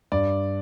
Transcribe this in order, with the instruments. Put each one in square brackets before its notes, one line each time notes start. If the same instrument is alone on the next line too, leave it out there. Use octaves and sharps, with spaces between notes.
[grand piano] G2 D5